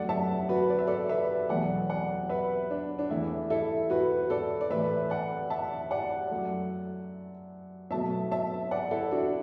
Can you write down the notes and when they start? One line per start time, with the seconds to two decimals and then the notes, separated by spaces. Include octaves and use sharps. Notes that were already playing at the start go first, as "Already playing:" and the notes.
Already playing: F#2 F#3 A3 D5 F#5
0.09 E5 A5
0.49 F#4 B4
0.70 D5
0.79 E5
0.88 A4 D5
1.09 B4 E5
1.49 E2 B2 F#3 A3 D5 F#5
1.90 D5 F#5
2.29 B4 E5
2.71 D4
2.99 D4
3.10 E2 E3 A3 E4
3.50 E4 A4
3.90 F#4 B4
4.30 A4 D5
4.61 D5
4.70 A2 E3 A3 B4 E5
5.10 D5 F#5
5.50 E5 A5
5.91 D5 F#5
6.31 F#2 F#3 A3
7.91 B2 F#3 A3 E5 A5
8.31 E5 A5
8.71 D5 F#5
8.91 E4 A4
9.11 D4 F#4